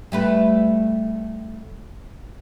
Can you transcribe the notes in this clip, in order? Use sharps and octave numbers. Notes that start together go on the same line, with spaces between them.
G3 A3 B4